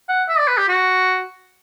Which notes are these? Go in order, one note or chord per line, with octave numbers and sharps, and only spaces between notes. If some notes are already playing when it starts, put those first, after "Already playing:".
F#5
E5
D5
B4
G4
F#4